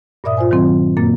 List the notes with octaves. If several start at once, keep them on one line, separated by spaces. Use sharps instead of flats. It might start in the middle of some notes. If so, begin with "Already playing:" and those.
G2 A#2 D5 E5 D#6
F4 C5 G#5
D#3 F#3 C4
F#2 A#2 A#3 A6